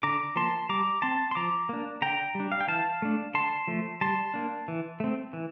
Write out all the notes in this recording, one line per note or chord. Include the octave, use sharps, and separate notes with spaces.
D3 A#5 D6
F3 A#3 A5 C6
G3 A#5 D6
C4 A5 C6
C6
F3 A#5 D6
A#3 D4
D3 G5 A#5
G3
D4
F5
G5
E3 F5 A5
A3 D4
D3 A5 C6
F3 A3
G3 A5 C6
A#3 D4
E3
A3 C4
E3